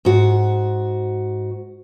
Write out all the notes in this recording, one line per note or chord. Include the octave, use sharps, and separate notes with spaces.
G#2 F#4